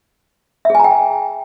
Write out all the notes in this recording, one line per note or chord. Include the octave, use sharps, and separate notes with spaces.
G#4 E5 G5 G#5 A#5